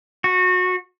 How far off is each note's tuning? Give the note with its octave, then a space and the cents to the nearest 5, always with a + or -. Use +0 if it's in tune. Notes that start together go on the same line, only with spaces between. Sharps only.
F#4 -20